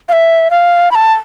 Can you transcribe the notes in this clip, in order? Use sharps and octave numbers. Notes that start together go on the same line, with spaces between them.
F5
E5
F5
B5
A5